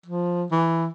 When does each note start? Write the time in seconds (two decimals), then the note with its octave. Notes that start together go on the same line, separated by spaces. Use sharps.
0.06 F3
0.51 E3